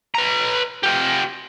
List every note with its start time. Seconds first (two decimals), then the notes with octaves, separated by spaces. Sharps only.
0.15 B4 A#5
0.83 F4 G4